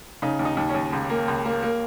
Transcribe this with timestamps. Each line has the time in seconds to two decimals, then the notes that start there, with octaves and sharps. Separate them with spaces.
0.22 C#3 D#4
0.39 D#2
0.45 D#4
0.57 D#2
0.69 C#4
0.75 D#2
0.93 C#2
1.10 A#3
1.28 C#2
1.45 A#3
1.63 A#3